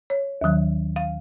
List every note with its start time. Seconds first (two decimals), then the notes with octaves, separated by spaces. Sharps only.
0.10 C#5
0.41 D#2 D#3 F#3
0.96 F5